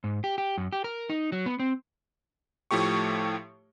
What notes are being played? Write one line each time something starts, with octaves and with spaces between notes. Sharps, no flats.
G#2
G4
G4
F#2
G4
A#4
D#4
F#3
B3
C4
A2 F3 A3 G4 C#6